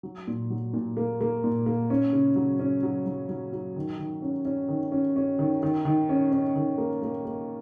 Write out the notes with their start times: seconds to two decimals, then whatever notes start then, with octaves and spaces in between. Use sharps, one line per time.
0.03 F#3
0.27 A#2
0.50 F#3
0.73 A#2
0.97 A#3
1.21 A#3
1.44 A#2
1.66 A#3
1.90 C#4
2.13 C#3
2.36 F#3
2.59 C#4
2.83 F#3
3.06 F#3
3.29 F#3
3.53 F#3
3.76 D#3
3.99 D#3
4.22 C#4
4.45 C#4
4.68 D#3
4.92 C#4
5.16 C#4
5.39 D#3
5.63 D#3
5.85 D#3
6.09 C#4
6.32 C#4
6.56 D#3
6.78 A#3
7.02 A#3
7.25 A#3